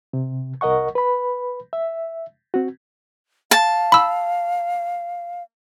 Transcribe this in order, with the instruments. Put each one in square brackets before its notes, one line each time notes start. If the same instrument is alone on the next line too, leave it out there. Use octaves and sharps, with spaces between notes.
[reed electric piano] C3
C2 A#4 D#5 F#5 C#6
B4 B5
E5
C4 F#4
[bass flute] F5 [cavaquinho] A5
[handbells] B5 E6